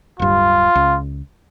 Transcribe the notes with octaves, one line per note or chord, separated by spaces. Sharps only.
D1 G2 F4
C#2